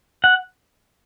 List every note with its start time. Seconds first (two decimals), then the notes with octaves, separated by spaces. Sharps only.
0.24 F#5